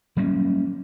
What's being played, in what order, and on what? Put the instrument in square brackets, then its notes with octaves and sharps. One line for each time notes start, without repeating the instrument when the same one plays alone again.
[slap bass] F#3 G3 A#3 C#4